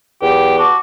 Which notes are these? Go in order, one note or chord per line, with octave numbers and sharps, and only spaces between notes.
E2 G4
F#4 A5 D6